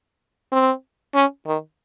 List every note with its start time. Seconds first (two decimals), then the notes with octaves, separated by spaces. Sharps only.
0.52 C4
1.15 C#4
1.46 D#3